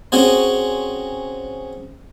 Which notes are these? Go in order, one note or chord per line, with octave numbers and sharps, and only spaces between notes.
C4 C#4 F#4 G#4 C5